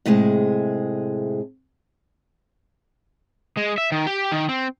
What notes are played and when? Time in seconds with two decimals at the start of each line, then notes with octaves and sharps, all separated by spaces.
0.06 A2 C3 G#3 G#4
3.57 G#3
3.78 E5
3.92 D#3
4.07 G4
4.32 D#3
4.49 C4